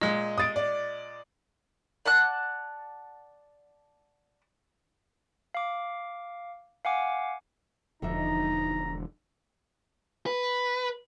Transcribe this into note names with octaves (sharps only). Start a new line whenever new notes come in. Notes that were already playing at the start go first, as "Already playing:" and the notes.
A#2 G#3 D#5
D#6 A6 D7
D5
D5 F#5 A5 F#6
F5 D6
F5 F#5 G#5 D6
E1 D3 F3 D#4 E5 A#5
B4